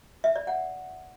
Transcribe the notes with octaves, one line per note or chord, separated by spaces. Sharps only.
E5
D5
F#5